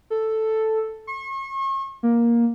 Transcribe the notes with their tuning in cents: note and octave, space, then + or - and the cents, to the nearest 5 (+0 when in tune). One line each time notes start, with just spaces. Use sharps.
A4 +0
C#6 -40
A#3 +10